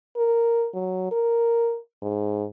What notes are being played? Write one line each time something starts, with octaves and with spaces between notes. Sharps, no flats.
A#4
F#3
A#4
G#2